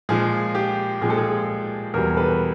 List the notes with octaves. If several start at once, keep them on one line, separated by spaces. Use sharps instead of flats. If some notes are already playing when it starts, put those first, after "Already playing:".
A#2 F3 G#3 G#4
G4
A#2 F3 G#3 G#4
A4
G#4
E2 B2 G3 G#4 A#4
A4 B4